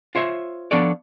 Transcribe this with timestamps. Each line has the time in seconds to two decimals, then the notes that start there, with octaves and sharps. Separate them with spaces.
0.15 F4 C5 C#5 E5
0.71 F3 B3 D4 A4 C#5 D5